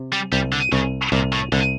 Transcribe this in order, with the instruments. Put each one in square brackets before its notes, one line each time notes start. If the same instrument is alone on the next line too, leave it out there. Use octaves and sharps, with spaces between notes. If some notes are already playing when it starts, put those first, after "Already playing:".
Already playing: [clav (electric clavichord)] C3
[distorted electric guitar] G3
[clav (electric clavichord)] C2 [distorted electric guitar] G3
[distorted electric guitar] D3
[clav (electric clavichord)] C2 [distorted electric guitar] C#3
[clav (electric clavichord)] C2 [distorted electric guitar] A#2
[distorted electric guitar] A2
[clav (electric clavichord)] C2 [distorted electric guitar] D3